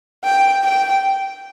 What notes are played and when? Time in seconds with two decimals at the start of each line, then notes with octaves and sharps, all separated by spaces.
0.24 G5
0.64 G5